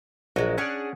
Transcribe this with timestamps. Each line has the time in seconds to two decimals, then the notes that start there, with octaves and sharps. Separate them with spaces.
0.36 A#1 F#3 G#3 F#4
0.58 C#4 D4 G#4 C#5 D5 F#5